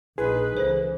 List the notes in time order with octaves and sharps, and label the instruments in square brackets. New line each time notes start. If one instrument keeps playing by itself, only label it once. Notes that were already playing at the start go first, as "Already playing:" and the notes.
[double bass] A#1 D#4 [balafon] E4 [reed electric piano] G#4 [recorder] B4
[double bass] C#2 E3 [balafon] D#4 A4 C5